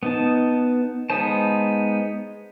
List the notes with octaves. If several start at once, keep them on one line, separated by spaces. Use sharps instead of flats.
B3 D#4 A5
G#3 B3 D#4 C5 A5